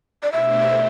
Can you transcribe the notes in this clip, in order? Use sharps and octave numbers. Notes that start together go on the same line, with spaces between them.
D5
B2 A3 D4 G4 C5 E5